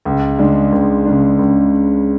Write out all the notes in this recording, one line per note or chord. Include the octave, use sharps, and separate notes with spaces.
C#2
C#3 G#3 D4
C#2
C#3 G#3 D4
C#2